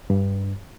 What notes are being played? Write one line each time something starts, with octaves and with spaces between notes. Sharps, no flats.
G2